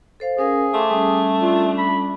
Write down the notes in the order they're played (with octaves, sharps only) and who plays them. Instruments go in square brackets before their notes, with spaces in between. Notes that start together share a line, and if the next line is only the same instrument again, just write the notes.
[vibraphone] A4 C5 F5
[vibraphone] C#4 A#4 F5 [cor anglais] G#4
[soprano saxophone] A3 [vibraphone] C6 D6
[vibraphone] G3 C#4 [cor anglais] G#4
[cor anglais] D4 [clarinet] F4
[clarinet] B5